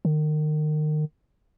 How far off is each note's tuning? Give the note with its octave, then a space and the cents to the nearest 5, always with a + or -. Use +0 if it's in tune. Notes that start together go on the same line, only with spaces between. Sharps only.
D#3 -30